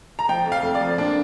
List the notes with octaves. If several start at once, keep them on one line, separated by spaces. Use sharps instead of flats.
A#5
F3 G5
F2
F5
F2
D5
F3
A#2 D4